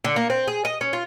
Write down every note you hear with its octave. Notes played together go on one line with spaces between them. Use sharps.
D3
A#3
C4
G#4
D#5
C#4
F4